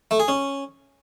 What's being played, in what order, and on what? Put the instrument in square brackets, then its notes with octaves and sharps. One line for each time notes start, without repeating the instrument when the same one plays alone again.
[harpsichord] A3
G#4
C#4